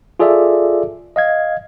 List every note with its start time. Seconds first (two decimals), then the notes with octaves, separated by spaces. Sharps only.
0.20 F4 G#4 A4 D5 E5
1.16 D#5 F5 G#6